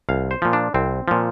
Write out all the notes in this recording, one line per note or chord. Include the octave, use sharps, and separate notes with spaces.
C2 F5
C5
A#2 F3
D4
C2 C4
A#2 F3